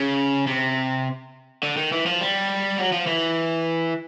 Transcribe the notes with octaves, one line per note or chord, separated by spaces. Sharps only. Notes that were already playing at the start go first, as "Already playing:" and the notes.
Already playing: C#3
C3
D3
D#3
E3
F3
G3
F#3
F3
E3